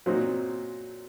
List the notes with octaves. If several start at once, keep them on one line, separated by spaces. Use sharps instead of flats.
A#2 F#3 C4 D#4